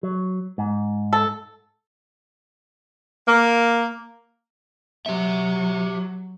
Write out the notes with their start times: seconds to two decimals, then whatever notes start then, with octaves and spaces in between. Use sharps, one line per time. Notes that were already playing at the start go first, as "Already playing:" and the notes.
0.03 F#3
0.58 G#2
1.13 A4
3.27 A#3
5.06 F#3 G4 E5